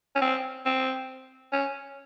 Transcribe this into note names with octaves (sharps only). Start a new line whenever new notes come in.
C#4
C4
C4
C#4